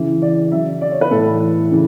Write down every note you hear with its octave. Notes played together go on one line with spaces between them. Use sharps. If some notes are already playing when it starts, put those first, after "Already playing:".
Already playing: C#3 E3
D5
C#3 F#3 E5
D5
C#5
B4
A2 E3 A4
C#3 E3